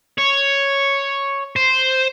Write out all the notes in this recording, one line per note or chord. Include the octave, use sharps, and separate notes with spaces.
C#5
C5